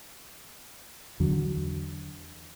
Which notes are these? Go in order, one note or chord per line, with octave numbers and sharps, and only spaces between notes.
E2 D3 F#3